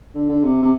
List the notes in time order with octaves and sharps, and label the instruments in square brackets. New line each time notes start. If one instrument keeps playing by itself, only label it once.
[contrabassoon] D3
D3
C3
C3